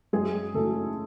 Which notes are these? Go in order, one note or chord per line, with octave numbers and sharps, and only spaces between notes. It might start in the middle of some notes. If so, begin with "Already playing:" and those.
F#2 G#3 G#4
C#3 F#3 A3 A4